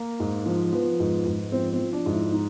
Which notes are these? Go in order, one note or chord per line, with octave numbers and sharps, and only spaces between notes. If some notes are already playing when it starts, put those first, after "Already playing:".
Already playing: A#3
G#2
F3
F3 B3
G#2
G#2
F3 C4
C4
F3
D4
G#2
E4
D#4